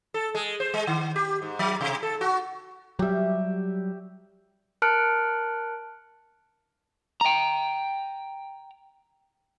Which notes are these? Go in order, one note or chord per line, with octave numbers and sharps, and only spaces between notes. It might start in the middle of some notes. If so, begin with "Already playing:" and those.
A4
G#3
C5
G#3
D#3
G4
G#2
F#3
C3
A4
F#4
F#3 G3 G4 E5
A#4 A5 F6 F#6 C#7 D7
G5 A#5